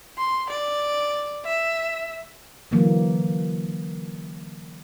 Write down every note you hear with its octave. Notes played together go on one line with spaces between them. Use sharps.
C6
D5
E5
D3 E3 F#3 A#3